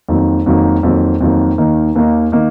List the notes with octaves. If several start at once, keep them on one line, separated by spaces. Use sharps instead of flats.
F2 D#3 F#3 A#3
F2 D#3 F#3 A#3
F2 D#3 F#3 A#3
F2 D#3 F#3 A#3
D#2 D#3 A#3 D#4
D#2 D#3 A#3 D#4
D#3 A#3 D#4